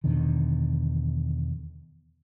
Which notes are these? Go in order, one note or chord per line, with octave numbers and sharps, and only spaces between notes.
E2 B2 D3 D#3